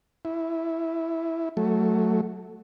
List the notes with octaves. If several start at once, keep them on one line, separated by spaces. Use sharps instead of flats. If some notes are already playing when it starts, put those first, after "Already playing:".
E4
F#3 A3